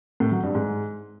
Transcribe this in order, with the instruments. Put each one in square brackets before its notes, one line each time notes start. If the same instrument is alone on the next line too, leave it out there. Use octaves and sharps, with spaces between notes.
[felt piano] A2
F#3
G2
G#2